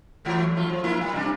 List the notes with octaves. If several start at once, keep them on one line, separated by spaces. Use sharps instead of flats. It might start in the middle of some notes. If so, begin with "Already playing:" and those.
E3 F#3 A3
A3 F4
F3
A#3 E4 F4
G3
C3 D4